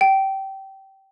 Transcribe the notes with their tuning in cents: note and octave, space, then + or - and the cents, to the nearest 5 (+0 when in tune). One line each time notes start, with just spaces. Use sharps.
G5 -20